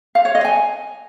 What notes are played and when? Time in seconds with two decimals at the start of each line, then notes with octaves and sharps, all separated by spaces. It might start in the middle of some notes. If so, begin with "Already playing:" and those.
0.15 F5
0.25 C#5
0.35 D#5
0.45 G#5